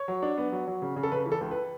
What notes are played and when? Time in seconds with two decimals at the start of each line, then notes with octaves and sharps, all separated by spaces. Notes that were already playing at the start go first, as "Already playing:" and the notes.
Already playing: C#5
0.08 F#3
0.22 D4
0.37 B3
0.52 F#3
0.68 F#3
0.82 C#3
0.96 C#3
1.03 A4
1.12 C#3 B4
1.26 E3
1.32 A4
1.41 C#2
1.51 B4